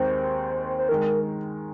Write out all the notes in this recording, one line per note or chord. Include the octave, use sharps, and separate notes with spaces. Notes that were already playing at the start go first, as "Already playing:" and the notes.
Already playing: D#2 D#3 G#3 C4 C5
C5
D#3 G#3 A#4